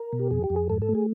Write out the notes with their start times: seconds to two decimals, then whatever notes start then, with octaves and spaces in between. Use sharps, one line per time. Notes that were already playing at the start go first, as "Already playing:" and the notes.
Already playing: A#4
0.13 B2
0.19 G4
0.31 F2 G#4
0.44 G4
0.50 F2
0.56 G#4
0.70 G#2 A4
0.82 A4
0.89 A3
0.95 G#4